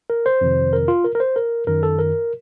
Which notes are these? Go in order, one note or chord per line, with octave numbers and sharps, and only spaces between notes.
A#4
C5
F2 C3 D#3
A#4
F4
A#4
A#4
C5
A#4
F#2 D#3 A#4
A4
A#4